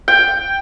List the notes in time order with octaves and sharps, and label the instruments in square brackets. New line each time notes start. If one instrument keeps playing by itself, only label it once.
[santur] G5